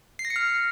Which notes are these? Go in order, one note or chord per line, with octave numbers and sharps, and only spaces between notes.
C7
A#6
C#7
F6